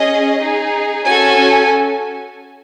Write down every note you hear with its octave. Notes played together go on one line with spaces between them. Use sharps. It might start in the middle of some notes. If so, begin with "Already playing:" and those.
Already playing: C#4 G#4 D#5
D#4 G#4
C#4 F#4 A4 G#5